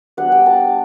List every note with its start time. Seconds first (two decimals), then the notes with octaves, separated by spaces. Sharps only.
0.17 G3 B3 D4 F#5
0.32 G5
0.46 A5